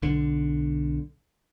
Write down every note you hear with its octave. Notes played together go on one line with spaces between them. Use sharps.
B1 D3